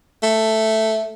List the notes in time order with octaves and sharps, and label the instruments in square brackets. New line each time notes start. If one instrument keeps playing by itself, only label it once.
[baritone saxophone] A3